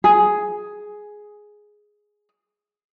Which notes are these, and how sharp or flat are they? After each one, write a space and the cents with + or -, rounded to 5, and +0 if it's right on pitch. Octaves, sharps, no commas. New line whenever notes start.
G#4 +5